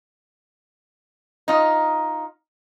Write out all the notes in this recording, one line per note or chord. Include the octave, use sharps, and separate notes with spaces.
D#4 F4